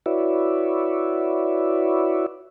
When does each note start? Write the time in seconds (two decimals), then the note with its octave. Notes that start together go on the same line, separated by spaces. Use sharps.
0.06 E4 F#4 B4 C#5 D5 E5